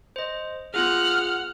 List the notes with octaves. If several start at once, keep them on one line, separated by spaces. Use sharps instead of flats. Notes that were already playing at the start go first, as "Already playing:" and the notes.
C5 D#5
B3 F4 G#4 F#5 F6